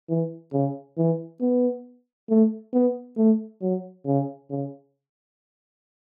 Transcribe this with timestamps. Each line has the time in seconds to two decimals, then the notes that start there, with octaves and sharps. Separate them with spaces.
0.09 E3
0.53 C#3
0.98 E3
1.41 B3
2.29 A3
2.73 B3
3.17 A3
3.62 F#3
4.06 C#3
4.50 C#3